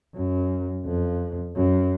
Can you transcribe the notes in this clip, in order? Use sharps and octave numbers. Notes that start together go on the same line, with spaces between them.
F#2
F2
F#2